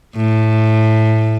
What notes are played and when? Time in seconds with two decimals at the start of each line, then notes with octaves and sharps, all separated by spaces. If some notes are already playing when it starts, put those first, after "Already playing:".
0.16 A2